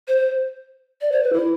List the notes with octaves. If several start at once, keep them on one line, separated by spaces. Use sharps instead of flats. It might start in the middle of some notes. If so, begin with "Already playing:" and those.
C5
D5
C5
B4
E4